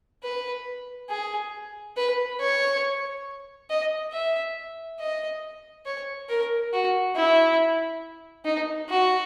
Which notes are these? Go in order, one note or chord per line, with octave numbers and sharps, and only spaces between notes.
B4
G#4
B4
C#5
D#5
E5
D#5
C#5
A#4
F#4
E4
D#4
F#4